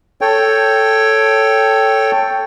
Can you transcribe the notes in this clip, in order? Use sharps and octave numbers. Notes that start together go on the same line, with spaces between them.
A4 C#5 G5